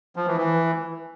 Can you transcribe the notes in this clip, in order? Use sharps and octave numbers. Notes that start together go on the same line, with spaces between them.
F3
E3
E3